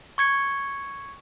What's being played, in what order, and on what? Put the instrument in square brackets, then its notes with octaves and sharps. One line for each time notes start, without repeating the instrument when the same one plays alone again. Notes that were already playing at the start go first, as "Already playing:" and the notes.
[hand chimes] C#6 G#6 C#7